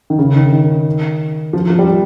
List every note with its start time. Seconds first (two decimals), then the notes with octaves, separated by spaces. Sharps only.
0.10 D#3
0.19 C#3
0.36 D#3
0.52 D#3
1.53 F3
1.70 F3
1.79 G3